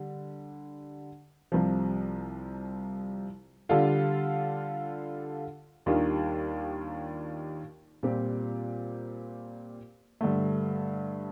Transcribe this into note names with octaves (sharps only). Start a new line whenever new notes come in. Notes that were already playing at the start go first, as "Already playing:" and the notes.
Already playing: D3 G3
C2 C3 F3
D3 G3 D4 F4 A4
D#2 D#3 G3 D4 F4
A#2 G3 C4 G4
G2 D3 A3